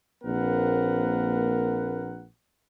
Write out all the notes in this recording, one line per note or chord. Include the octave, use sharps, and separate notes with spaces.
A#1 A#3 C4 A#4 B4 F#5